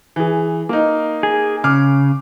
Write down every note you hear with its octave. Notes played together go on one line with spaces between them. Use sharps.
E3 G#4
A#3 D#4
G#4
C#3 D6 F6